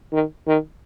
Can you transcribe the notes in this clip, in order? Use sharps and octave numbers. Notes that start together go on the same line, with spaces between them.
D#3
D#3